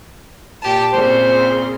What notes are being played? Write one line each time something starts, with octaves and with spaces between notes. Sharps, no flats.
A#2 G4 A5
A#2 C#3 C4 C5